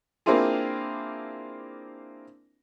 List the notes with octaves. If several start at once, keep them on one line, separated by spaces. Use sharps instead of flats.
A#3 C4 D4 E4 F4 G#4